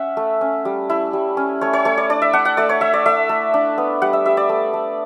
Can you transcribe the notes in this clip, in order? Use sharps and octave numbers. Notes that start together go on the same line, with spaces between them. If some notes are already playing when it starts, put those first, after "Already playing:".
Already playing: C#4 E5 F#5
A3
C#4
G3
E4
G3
C#4
A3 C#5
C#5
A3 C#5
D5
D4 D5
E5
D4 F#5
F#5
A3 D5
C#5
A3 E5
D5
A3 E5
A3
D4
B3
G3 F#5
E5
G3 E5
D5
A3
A3